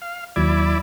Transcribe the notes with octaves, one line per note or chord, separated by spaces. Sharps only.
F5
D#2 F#3 E4 D5 G#6